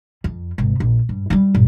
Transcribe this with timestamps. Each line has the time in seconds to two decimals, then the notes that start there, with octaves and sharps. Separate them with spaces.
0.24 F2
0.58 G#1 C3
0.80 A#1
1.09 G2
1.30 G3 E4
1.55 G1 A#2